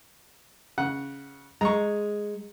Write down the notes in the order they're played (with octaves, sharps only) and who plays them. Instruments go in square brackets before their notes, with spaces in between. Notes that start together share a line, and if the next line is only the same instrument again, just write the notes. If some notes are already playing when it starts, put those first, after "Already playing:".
[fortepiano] C#3 F#5
[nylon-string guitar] G#3 [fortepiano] A#5 C#6